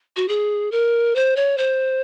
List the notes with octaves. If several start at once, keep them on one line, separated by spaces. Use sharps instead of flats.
F#4
G#4
A#4
C5
C#5
C5